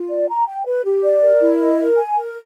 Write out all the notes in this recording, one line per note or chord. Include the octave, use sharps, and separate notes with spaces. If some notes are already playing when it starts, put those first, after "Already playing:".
Already playing: F4
D5
A#5
G5
B4
G4
D5
A#4
E4
D#5
A#4
G#5
A#4